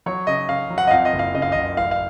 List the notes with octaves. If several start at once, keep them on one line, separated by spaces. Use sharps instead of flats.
F#3 C#5
C#3 D#5
C#3 F5
F#3
F#5
D#5
F2 F5
D#5
F#1
F5
C#3 D#5
F5
F#1 D#5
A1 F5
F5